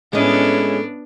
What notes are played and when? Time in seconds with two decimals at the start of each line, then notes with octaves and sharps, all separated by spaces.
0.13 A2 G#3 B3 C#4 D4 E4 D#5